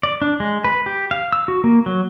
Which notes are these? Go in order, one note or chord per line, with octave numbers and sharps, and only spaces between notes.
D5
D4
G#3
B4
G4
F5
E6
F#4
A#3
F#3